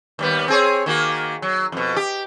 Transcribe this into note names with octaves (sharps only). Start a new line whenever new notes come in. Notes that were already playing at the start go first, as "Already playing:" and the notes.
D#2 G3 B3
C4 G#4 C#5
D#3 A#3 F#4
F#3
F2 B2
G4